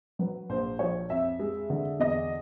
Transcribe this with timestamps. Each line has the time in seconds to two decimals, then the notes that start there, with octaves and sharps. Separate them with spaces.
0.19 F#3 B4
0.49 A#1 C5
0.79 F3 C#5
1.10 F2 E5
1.40 G#3
1.70 D3
1.99 E2 D#5